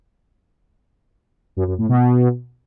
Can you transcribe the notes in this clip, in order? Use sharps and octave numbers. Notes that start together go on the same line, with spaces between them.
F#2
F#2
A2
B2